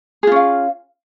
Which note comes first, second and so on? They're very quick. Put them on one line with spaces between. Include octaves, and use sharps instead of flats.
G#4 F4 C#4 F5